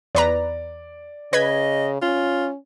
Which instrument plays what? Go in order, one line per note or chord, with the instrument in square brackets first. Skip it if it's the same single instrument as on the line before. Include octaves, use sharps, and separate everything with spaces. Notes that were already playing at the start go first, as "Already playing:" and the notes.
[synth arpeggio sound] E2 B4 A#5 [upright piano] D5
[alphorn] C#3 [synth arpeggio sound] B4 G#6 B6 [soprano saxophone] D#5
[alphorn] C#4 [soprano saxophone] F4